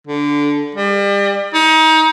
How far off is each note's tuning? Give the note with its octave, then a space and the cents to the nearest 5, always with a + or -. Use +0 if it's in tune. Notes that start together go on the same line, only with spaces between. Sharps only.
D3 -10
G3 +35
D#4 +30